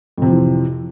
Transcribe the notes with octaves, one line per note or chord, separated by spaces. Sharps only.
F2 C3 E3 F3